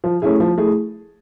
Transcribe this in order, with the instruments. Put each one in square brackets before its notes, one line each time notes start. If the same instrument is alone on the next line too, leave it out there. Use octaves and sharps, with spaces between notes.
[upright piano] F3
A3 C#4 E4 G#4
F3
A3 E4 G#4